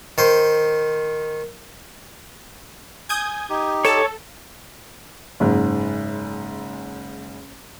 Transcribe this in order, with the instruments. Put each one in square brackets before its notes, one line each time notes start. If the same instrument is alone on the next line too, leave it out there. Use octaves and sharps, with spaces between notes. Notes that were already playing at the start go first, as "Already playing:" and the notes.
[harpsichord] D#3 C5
[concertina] G#5 [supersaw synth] D#6 G6 G#6
[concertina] D#4 G4
[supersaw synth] A4 [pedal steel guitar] C#5 A5
[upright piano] F#1 G#2 C#3